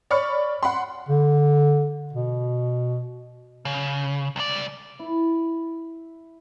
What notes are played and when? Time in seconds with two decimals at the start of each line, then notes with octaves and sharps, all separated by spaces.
0.10 C#5 D5 B5 C#6 F6 C#7
0.63 F#5 B5 C6
1.09 D3
2.13 B2
3.65 C#3
4.36 C2 D5
4.99 E4